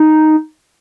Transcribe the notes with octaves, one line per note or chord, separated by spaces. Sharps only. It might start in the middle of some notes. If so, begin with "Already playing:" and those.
Already playing: D#4